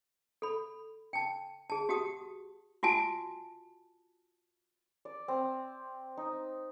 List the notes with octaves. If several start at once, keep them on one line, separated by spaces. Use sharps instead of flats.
A4 B5
G5 A5
G#4 A5
F#4 G4 F#5 A5 D#6
F4 F#4 G#5 A5
D5
C4
D#4